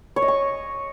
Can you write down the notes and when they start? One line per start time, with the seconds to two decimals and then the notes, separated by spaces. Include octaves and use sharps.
0.16 C#5
0.22 D#5
0.28 C#6